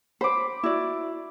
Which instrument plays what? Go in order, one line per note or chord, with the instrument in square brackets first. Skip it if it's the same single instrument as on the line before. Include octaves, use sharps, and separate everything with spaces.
[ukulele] C5 [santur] B5 D6
[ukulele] E4 F#4 D5